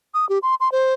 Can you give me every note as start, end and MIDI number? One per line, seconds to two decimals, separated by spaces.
0.14 0.28 87
0.29 0.39 67
0.43 0.55 84
0.60 0.71 84
0.72 0.94 72